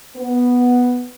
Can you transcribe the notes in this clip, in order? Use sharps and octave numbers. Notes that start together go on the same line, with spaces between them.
B3